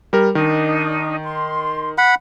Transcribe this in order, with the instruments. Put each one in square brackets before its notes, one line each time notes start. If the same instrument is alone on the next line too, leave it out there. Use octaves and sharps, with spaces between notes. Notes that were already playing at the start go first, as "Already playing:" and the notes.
[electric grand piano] G3 A#4
[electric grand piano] D#3 [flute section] D4 D#4
[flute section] C6
[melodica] F#5 B5